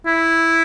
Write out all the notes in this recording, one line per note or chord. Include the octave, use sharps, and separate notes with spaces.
E4